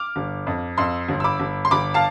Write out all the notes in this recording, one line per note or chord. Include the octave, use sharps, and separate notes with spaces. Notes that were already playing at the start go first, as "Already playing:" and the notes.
Already playing: D6 F6
G1
F2
F2 C6 E6
G1
E6
B5 D6
G1
C6
G1 B5 D6
F5 A5